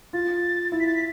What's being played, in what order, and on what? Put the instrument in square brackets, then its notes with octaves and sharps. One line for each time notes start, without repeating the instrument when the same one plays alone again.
[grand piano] F4 [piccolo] A6
[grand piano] E4 [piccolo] A6
[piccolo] B6
A6
B6